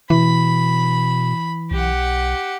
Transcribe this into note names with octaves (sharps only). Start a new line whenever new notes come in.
B2 E3 B5
B1 G4 F#5